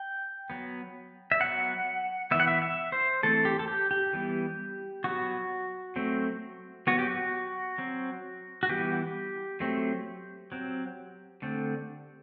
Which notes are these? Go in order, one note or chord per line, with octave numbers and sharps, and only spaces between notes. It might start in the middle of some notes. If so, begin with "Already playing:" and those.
Already playing: G5
F#3 B3
E5
F#3 B3 F#5
E3 B3 E5
F#5
E5
E5
C5
E3 A3 C4 A4
G4
A4
G4
G4
E3 G3 B3
F#3 B3 F#4
F#3 A3 C4
F#3 B3 F#4
G4
F#4
F#3 C4
F#4
E3 G3 B3 G4
F#3 A3 C4
F#3 C4
D3 A3 C4